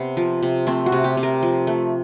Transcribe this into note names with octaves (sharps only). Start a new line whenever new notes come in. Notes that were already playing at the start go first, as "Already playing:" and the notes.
Already playing: C3 B3
F3
C3
A3 C4
F#4
C3
G4
C3
A#4
F3
A3